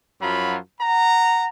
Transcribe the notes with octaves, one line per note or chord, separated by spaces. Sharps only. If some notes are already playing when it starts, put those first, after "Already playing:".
F#2 F3 F#3 F4 B5
F#5 A#5